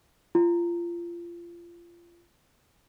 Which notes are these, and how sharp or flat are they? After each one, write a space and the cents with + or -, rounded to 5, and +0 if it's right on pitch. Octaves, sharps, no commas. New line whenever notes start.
F4 -25